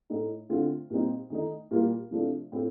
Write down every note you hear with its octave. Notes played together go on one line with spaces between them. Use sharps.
A2 A3 D#4
D3 A3 C4 F4
A#2 G3 C4 D#4
D#3 A3 D#4
A#2 G3 A#3 F4
C3 F3 A3 D4
A2 A3 C4 F4